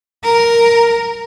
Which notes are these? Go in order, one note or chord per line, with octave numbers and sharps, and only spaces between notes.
A#4